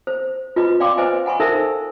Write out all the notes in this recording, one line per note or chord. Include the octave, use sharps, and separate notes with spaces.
C5
F4 B4 D#5 B5
D5 F5 G5 C6 D6
B4 C5 D#5 G#5
F#5 G#5 B5 C#6
D#4 A4 A#4 C5 E5